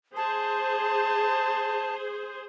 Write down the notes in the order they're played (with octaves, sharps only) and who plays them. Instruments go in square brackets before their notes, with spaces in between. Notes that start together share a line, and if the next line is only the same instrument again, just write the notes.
[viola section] G#4 C5 [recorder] A5